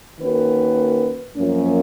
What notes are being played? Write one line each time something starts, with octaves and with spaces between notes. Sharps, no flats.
D#3 A#3 C#4 F#4 B4
F#2 F3 A#3 C#4